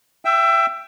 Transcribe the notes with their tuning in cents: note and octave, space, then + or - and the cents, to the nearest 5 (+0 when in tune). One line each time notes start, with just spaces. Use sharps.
E5 +25 G5 +0 E6 +0